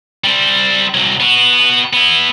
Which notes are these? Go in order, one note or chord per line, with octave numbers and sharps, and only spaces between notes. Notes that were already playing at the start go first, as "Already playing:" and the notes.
G3 C4
C2 F#3
B3 F#4
B3 E4